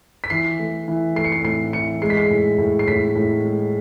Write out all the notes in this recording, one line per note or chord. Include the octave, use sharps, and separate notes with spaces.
B6
E3 C7
A3
E3
A3 C7
C#7
C7
A2 C7
E3 C#7
G#3 C7
B6
C7
A2
A2
C7
A2 B6
A2
G#3